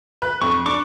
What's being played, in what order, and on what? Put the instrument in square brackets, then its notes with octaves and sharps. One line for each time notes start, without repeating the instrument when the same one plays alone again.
[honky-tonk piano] B4 F#6
[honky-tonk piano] F2 [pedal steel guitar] C#6
[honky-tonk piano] D4 [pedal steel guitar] C#6 D6